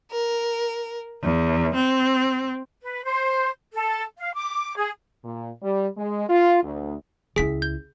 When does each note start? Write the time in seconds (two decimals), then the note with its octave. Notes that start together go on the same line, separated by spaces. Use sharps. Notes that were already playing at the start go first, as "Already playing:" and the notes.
0.12 A#4
1.23 E2
1.75 C4
2.81 B4
3.04 C5
3.73 A4
4.17 F5
4.35 D6
4.77 G#4
5.24 A#2
5.62 G3
5.97 G#3
6.29 F4
6.63 D2
7.36 C#2 E4 G#4 B6
7.62 G6